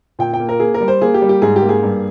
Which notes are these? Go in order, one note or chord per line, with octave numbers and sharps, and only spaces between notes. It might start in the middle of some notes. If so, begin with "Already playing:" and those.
A#2 G5
G5
A#3
A#4
A#3 G#4
A#4
G3
C5
A#3 G#4
G4
G3
G4
G#2 G#4
G4
A#3
G#4
G2